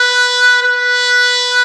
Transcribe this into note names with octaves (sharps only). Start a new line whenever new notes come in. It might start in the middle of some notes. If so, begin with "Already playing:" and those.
Already playing: B4
B4